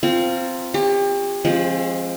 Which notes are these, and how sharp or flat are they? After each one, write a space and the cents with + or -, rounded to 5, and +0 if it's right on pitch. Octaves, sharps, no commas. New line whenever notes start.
C4 +0 F4 -5 A#4 -35
G4 +35 C#5 +0
F3 +0 G#3 +0 C4 +45